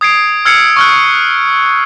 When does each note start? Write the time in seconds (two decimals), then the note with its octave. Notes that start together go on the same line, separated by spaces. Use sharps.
0.01 D#6 G#6 C7 D7
0.45 E6 F6 G#6 C7 C#7
0.76 C#6 F6 F#6